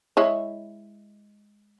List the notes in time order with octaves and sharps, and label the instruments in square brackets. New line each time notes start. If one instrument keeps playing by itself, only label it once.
[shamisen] G#3 E4 C#5